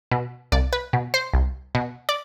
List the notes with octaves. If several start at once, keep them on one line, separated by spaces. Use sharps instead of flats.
B2
C2 D5
B4
B2
C5
C2
B2
D5